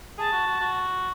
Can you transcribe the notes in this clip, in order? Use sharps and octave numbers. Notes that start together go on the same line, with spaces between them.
G#4 A5
F#4
F#4
F#4